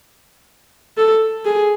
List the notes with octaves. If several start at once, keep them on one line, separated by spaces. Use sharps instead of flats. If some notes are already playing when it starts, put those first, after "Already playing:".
A4
G#4